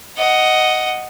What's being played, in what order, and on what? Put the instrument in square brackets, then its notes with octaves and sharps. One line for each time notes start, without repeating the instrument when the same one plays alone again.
[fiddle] D#5 F#5